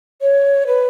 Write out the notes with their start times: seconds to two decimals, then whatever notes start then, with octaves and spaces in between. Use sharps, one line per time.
0.22 C#5
0.67 B4